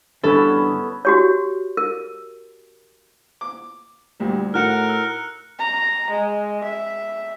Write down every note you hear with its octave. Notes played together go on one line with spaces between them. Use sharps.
G2 D3 E3 B3 C#4 E4 A4
F#4 G4 C#5
A#4
D6
D2 A#2 G3
A2 D#3 F#4 A#4 F6 F#6 C#7
E6
A#5
G#3
E5